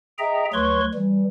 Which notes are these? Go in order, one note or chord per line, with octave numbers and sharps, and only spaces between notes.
G#4 D#5 E5 G5 A#5
D2 F#3 B4 C#5 C6 C#6
E3 G3